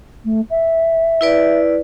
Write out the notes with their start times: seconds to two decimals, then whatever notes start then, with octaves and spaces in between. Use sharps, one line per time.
0.24 A3
0.50 E5
1.21 E4 B4 D5